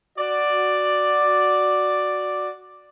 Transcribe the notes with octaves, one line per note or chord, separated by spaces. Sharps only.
F#4 D5